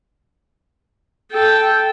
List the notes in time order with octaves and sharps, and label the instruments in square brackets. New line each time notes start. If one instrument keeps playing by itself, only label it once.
[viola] A4 G5